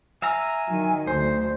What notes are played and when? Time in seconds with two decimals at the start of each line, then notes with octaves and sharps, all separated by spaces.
0.22 E5 F5 G#5 A#5
0.66 D#3 F#3
1.07 D2 C5